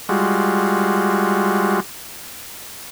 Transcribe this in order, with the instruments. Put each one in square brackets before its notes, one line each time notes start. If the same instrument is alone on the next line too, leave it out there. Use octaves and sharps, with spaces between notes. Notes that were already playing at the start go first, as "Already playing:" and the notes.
[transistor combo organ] G3 G#3 F4 F#4